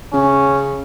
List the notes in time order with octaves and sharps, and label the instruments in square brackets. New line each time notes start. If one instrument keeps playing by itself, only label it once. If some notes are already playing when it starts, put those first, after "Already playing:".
[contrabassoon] C#3 [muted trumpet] C#4